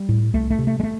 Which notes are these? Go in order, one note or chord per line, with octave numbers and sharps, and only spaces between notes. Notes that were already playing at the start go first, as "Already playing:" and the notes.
Already playing: G3
A2
C2 A3
A3
C3
A3
G#3
A3